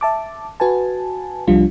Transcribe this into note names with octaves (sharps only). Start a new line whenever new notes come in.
E5 A5 D6
F#4 B4 G#5 A5
C2 F3 G3 D4 F4